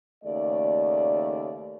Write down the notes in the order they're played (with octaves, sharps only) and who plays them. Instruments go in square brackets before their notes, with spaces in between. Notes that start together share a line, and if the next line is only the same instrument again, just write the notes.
[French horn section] D#2 C#3 A3 D5